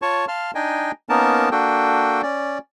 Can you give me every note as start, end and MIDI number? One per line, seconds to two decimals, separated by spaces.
0.02 0.25 65
0.02 0.25 73
0.02 0.25 81
0.02 0.25 85
0.28 0.51 77
0.28 0.51 81
0.28 0.51 84
0.28 0.51 89
0.55 0.91 62
0.55 0.91 63
0.55 0.91 75
0.55 0.91 79
0.55 0.91 80
1.09 1.49 58
1.09 1.49 59
1.09 1.49 61
1.09 1.49 63
1.09 1.49 70
1.09 1.49 81
1.51 2.22 58
1.51 2.22 62
1.51 2.22 66
1.51 2.22 69
1.51 2.22 79
2.22 2.58 61
2.22 2.58 74